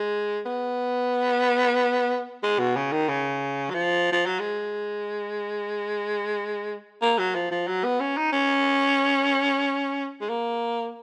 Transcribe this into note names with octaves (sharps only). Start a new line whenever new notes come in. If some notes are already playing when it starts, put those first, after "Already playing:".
Already playing: G#3
B3
G#3
B2
C#3
D#3
C#3
F#3
F3
F3
F#3
G#3
A#3
F#3
F3
F3
F#3
B3
C#4
D#4
C#4
G#3
A#3